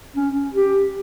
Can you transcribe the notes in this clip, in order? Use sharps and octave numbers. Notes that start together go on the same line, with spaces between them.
C#4
G4